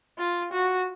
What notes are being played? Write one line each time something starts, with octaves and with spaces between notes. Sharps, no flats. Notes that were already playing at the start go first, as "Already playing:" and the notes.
F4
F#4